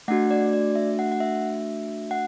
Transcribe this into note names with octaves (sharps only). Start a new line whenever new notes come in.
A3 D4 F#4 F#5
D5
D5
E5
F#5
F#5
E5
F#5